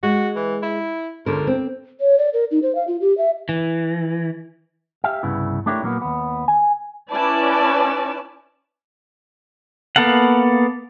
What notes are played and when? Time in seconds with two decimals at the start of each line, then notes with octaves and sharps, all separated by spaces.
0.03 G#3 F#4
0.36 E3
0.63 E4
1.26 C#2 D3 A#4
1.47 C4
2.00 C#5
2.18 D5
2.34 A#4
2.51 D#4
2.63 C5
2.75 F5
2.88 F4
3.01 G4
3.18 E5
3.49 E3
5.04 G4 E5 F5
5.23 C2 G2 C#3 B3 E4
5.66 A3 D4 E4 G4 A#4 C#5
5.82 A#2 F#3 A#3 B3
6.02 D#2 B3
6.48 G#5
7.12 C#4 E4 B4 D5 A5
9.96 A#3 B3 A4 F5 F#5